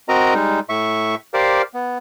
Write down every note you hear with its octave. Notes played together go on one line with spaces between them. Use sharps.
C4 F#4 A#4 D#5 A#5
G3 G#3 D#4
A2 E5 C#6
G4 A#4 C5 D5 F5
B3